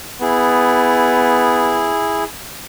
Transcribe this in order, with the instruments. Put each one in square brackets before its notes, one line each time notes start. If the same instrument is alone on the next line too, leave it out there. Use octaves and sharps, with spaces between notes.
[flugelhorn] B3 [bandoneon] E4 G#4